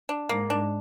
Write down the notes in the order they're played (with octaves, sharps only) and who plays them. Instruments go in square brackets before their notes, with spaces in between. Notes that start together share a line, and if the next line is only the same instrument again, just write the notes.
[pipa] D4
[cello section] G#2 [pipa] A#3
[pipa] D4